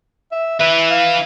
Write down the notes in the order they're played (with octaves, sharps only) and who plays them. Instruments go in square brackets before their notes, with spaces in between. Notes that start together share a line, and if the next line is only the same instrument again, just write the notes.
[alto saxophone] E5
[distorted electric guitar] E4 B4 [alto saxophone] E5
[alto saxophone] F5